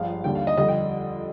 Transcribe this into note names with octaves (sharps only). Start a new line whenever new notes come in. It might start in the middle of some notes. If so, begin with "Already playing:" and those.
Already playing: G1 G2 F3 G#3 F5
D#2 D3 G3 D4 G5
F5
D#5
F2 D3 G3 D#5
G5